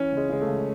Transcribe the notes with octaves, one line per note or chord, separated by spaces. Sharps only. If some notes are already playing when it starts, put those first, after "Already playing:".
Already playing: E3 C#4
C#2
G#3
C#3 G#3
A3
C#2